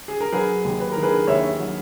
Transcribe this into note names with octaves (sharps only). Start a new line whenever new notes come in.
G#4
A#4
F#3 G#4 B4
D#2
B4
D#3 A#4
G#4 B4
D#2 C#5 E5
F#3